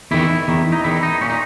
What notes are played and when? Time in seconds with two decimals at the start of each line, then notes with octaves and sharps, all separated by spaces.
0.11 E2 D#3 E4
0.48 E2 D#3
0.72 D#4
0.84 E2 D#3 E4
1.03 D#4
1.21 A#2 C#4
1.30 D#4